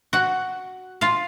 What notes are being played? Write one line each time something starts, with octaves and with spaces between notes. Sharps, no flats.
F#4 F#5
F4 F5